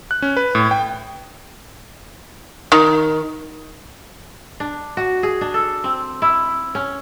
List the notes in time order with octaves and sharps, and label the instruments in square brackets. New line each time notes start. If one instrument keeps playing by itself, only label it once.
[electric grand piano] F#6
C#4
B4
A2
G5
[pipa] D#3
[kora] D4
F#4
G#4
D4
A4
C4
E4
C#4